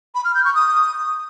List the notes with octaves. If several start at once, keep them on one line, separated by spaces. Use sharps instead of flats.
B5
F6
G6
C#6
D#6